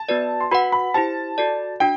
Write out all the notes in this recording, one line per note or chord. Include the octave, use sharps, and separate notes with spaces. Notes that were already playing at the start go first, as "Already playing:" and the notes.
Already playing: A5
B3 F#4 B4 D5
C6
F#4 B4 F#5 B5
B5
E4 G4 C5 A5
F#4 A4 D5
D4 F#4 G5